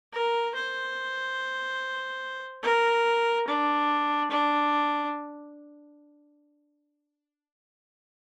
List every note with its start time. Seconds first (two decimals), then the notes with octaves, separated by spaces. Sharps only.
0.13 A#4
0.54 C5
2.63 A#4
3.48 D4
4.31 D4